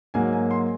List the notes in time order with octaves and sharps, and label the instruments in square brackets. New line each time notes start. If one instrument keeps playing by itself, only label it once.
[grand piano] G#2 F#3 A#3 G#5
G#5
C6